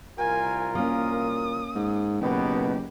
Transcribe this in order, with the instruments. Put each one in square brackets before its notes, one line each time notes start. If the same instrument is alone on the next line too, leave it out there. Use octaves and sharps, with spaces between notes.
[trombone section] C2 F4 A#4 [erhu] G#5
[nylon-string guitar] A#3 C#4 [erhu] D#6
[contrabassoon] G#2
[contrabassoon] F#1 [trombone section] B2 D#3 B3 [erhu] G4